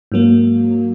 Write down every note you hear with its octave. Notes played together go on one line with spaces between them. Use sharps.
G#2 F#3 A#3